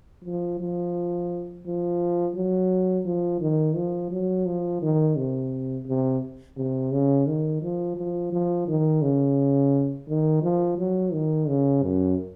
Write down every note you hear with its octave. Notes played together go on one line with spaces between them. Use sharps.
F3
F3
F3
F#3
F3
D#3
F3
F#3
F3
D#3
C3
C3
C3
C#3
D#3
F3
F3
F3
D#3
C#3
D#3
F3
F#3
D#3
C#3
F#2